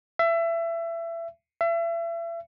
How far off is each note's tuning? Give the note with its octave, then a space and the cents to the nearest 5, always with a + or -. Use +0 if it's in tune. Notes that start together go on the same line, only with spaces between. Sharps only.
E5 +25
E5 +35